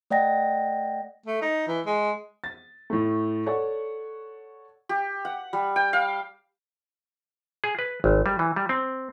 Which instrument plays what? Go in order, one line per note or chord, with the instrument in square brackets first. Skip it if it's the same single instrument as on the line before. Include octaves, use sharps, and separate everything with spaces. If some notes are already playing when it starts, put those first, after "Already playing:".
[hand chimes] A3 D5 D#5 F#5 G5 A#6
[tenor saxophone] A3
D#4
E3
G#3
[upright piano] A6
A2 A3
A4 C#5 D5 F#5 C#6
[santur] G4
F#5
G3
G5
F5
[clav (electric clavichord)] G#4
B4
G#1
G3
E3
G3
C4